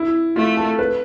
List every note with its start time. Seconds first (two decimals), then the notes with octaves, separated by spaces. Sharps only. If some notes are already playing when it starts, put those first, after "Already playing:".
Already playing: E4
0.36 A3 F4
0.57 A4
0.79 B4